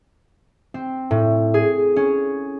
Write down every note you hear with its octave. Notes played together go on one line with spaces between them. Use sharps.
C4
A2
G#4
C#4